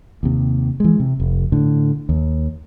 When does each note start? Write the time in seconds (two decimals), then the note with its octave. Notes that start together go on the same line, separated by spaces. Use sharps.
0.23 D#2 C3
0.80 E3 G#3
1.00 C3
1.20 F1
1.52 A2 D3
2.09 D#2